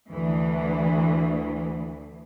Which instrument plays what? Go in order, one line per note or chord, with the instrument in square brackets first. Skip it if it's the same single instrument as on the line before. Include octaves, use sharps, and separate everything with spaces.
[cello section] D2 E3